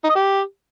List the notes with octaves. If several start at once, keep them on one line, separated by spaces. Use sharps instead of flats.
D#4
D#5
G4